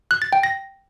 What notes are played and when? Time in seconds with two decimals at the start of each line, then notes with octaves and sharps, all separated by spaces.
0.11 F#6
0.22 A6
0.33 G5
0.43 A#6